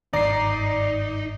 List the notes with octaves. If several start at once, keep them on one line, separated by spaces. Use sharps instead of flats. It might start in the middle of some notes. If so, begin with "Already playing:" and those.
G1 G#2 D#3 D#4 D5 A#5 C7